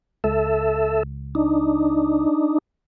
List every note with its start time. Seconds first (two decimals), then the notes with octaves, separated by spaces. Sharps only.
0.24 C#2 A4 E5
1.35 D4 D#4